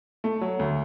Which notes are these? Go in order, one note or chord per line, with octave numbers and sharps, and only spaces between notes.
A3
F#3
D2